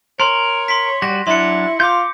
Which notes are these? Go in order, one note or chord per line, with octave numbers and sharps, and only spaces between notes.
A#4 C#5 C6
C6 B6
G3 F#4 A#6
F#3 D4 E4 C6 C#7
F4 D6 G6